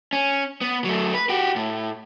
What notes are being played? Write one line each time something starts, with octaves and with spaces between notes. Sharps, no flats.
C#4
B3
F#3 A3
B4
F#4 G4
A2